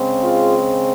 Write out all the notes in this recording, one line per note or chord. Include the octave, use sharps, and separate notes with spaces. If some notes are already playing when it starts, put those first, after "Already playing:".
Already playing: C#3 G#3 C4
F4 G#4